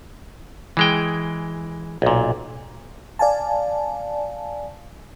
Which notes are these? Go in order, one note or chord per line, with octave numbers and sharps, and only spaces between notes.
E3 G#3 G5
B1 A#2
D5 F5 G#5 A5